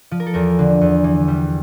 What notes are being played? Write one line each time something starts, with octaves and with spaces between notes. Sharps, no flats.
F3
A#4
A4
E2 A#4
D3
E2
E3
G3